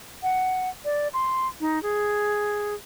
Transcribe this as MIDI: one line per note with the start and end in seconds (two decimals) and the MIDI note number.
0.23 0.70 78
0.85 1.08 74
1.13 1.48 84
1.60 1.81 63
1.83 2.74 68